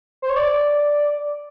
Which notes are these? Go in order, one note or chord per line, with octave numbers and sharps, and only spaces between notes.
C5
C#5
D5